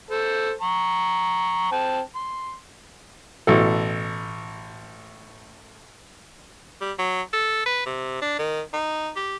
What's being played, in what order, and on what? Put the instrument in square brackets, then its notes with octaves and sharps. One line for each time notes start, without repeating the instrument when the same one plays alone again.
[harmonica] A4 C5
A#5 C#6
C4 G5 A5
C6
[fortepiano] A1 B2 A4
[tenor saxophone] G3
F#3
A4
B4
C3
D4
D#3
D#4
G4